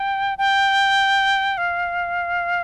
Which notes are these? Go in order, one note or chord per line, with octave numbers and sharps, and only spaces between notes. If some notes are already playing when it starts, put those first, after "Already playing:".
Already playing: G5
G5
F5